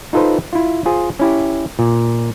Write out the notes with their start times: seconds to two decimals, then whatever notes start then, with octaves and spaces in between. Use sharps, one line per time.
0.13 D#4 F4 A4 B4 C5
0.53 E4 F4
0.86 F4 G#4 C5
1.19 C#4 E4 G4
1.79 A#2